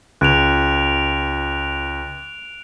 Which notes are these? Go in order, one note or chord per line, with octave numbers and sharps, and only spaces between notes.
C#2 F#6 D7 F7